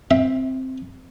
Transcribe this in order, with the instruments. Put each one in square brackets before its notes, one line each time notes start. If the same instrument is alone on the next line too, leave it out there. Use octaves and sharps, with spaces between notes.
[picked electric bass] C4 [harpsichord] E5